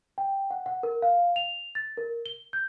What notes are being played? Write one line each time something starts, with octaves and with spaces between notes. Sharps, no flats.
G5
F#5
F#5
A#4
F5
F7
A6
A#4
G7
G6